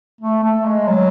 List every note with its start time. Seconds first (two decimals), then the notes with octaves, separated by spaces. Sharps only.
0.21 A3
0.43 A3
0.66 G#3
0.88 F#3